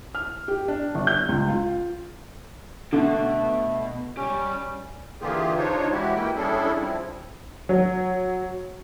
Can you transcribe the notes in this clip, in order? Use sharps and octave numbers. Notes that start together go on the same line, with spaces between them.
F6
G4
D4
G1
G6
C#2
F4
B2 D3 A3
C#4 G4 D5
D3 E3 A#3 F4 G4 G#4
D4 D#4 F4 C5 C#5
E3 G#3 E4 F#4 G4
A#3 E4 G5
G3 C#4 D4 E4 G#4 A4
F3 C4 E4
F#3